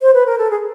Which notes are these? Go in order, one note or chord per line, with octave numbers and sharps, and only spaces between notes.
C5
B4
A#4
A4
G#4